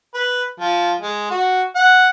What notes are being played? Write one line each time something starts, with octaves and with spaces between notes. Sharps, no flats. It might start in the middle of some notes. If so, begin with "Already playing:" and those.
B4
F3
G#3
F#4
F#5